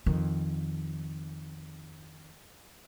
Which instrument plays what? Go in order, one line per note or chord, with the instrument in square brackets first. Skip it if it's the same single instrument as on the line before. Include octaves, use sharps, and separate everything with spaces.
[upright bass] F2 D#3